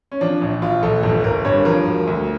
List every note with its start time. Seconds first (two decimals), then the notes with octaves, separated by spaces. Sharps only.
0.12 C#4
0.21 F3 D4
0.41 A#1
0.62 A#1 F4
0.83 A#1 A4
1.03 G1 A4
1.24 G1 A#4
1.44 G2 C#5
1.65 F3 A#4
1.86 E1
2.07 D2